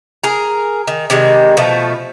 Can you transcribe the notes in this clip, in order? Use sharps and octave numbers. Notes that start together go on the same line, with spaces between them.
G#4 A#4
D#3
C3 D#3 G3 G#3
B2 F3 A3